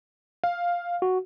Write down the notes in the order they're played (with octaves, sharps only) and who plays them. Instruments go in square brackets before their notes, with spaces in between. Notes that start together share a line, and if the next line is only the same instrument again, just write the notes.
[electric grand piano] F5
[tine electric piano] F#4